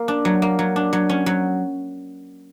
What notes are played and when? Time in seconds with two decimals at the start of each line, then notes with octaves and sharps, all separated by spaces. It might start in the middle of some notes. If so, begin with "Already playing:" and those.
Already playing: A#3
0.08 D4
0.25 F#3
0.42 A#3
0.59 F#3
0.76 D4
0.93 F#3
1.09 C#4
1.26 F#3